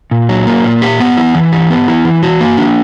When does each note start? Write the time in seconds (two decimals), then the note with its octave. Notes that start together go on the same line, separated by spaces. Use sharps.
0.11 A#2
0.29 F#3
0.47 A#3
0.65 A#2
0.82 G4
1.00 B3
1.17 E4
1.35 E3
1.52 G4
1.70 B3
1.88 E4
2.05 E3
2.23 F#4
2.41 A#3
2.58 D4